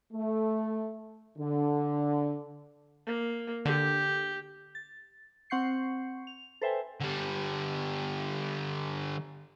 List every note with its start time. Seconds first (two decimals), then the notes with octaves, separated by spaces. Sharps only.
0.13 A3
1.39 D3
3.06 A#3
3.65 D3 G4
4.75 A6
5.50 C4 F#5 C#6 G6 C7 C#7
6.27 F7
6.61 A4 B4 C5 E5 G5 G#5
7.01 D3 G3